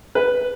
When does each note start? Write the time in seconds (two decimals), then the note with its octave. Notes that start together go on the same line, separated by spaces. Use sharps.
0.15 B4